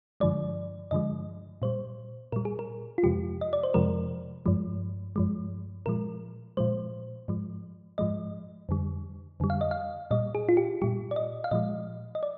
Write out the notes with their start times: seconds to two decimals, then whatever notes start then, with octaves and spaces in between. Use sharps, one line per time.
0.20 G2 D3 F3 G#3 D5
0.91 G2 D3 F3 G#3 D#5
1.62 A#2 G3 C5
2.32 A#2 G3 A#4
2.45 G#4
2.59 A#4
2.98 F4
3.03 F2 C3 F3 G#3 G4
3.41 D#5
3.53 D5
3.63 C5
3.74 F2 C3 F3 G#3 A#4
4.46 G2 F3 G#3
5.16 G2 F3 G#3
5.86 A#2 F3 G#3 A#4
6.57 A#2 F3 G#3 C5
7.28 G#2 F3 G#3
7.98 G#2 F3 G#3 D#5
8.69 F2 D3 G3
9.40 F2 D3 G3
9.50 F5
9.61 D#5
9.71 F5
10.11 A#2 G3 D#5
10.35 G#4
10.49 F4
10.57 G4
10.82 A#2 G3 G4
11.11 D5
11.16 D#5
11.44 F5
11.51 A#2 F3 G#3 D#5
12.15 D#5
12.23 D5